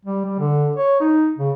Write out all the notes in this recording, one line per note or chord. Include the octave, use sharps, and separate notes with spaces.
G3
G3
D3
C#5
D#4
C#3